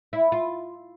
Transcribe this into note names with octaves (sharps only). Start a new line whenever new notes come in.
E4
F4